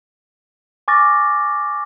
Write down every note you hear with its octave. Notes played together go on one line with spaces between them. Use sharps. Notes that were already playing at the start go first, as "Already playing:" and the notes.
G#5 C#6 D6 F6 A6 A#6